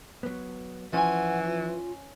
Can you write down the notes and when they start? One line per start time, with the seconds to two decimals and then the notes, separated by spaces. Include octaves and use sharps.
0.23 F#3 B3
0.93 E3 F3 C#4 F#5 G#5
1.47 F4